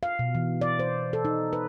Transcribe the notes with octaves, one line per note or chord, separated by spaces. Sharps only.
F5
B2
E3
D5
C5
A4
D#4
B4